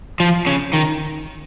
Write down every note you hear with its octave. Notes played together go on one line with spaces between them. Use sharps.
F3
C#3
D#3